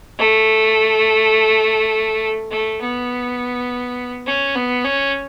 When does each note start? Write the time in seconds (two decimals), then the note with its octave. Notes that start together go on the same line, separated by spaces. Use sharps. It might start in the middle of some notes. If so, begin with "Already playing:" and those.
0.18 A3
2.51 A3
2.81 B3
4.26 C#4
4.55 B3
4.84 C#4